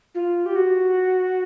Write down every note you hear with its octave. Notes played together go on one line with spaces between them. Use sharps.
F4
G4
F#4